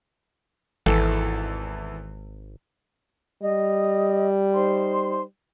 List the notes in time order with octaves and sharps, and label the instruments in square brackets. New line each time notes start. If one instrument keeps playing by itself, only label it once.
[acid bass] G#1 [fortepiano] E2 E3 A4
[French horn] G3 [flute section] D#5
[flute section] D#4 C5 C6